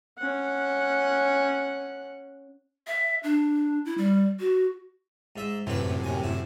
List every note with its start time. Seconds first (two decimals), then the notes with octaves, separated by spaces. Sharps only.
0.18 C#4 F#5
2.87 E5
3.23 D4
3.85 E4
3.98 G3
4.40 F#4
5.36 G#2 E5
5.67 F#2 A2 C3 E3 B4
6.04 D#2 G#5
6.24 E4